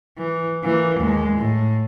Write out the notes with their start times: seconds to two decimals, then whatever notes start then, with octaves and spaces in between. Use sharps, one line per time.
0.18 E3
0.64 E3 A#3
1.00 D#2 G#3
1.36 A2